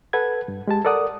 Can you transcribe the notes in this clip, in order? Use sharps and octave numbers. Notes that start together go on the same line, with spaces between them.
A4 B4 F#5 G#6
G2
G#3 G4 A5
A4 A#4 D5 F#5 D#6